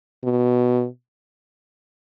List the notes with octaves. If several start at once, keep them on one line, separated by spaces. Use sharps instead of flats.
B2